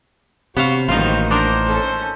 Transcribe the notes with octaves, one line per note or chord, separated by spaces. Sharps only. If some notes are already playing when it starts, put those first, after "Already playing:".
C3 B3 F#4 C5 C#5 F5
A1 D#3 A#3 D#4 F4 F#4 C5
D4 D#4 A#4 C5
C#4 A4